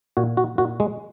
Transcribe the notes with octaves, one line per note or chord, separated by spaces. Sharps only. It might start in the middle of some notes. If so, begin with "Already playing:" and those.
A#2 F#4
F#4
A#2 F#4
G#3